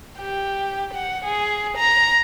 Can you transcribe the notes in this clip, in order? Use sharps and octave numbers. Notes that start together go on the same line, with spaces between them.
G4
F#5
G#4
A#5